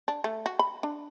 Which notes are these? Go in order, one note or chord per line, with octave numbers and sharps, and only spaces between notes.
D4
A3
F#4
B5
D4